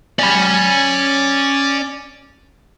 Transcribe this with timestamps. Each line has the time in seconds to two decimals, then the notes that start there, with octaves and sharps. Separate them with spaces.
0.19 C#4 D5 B5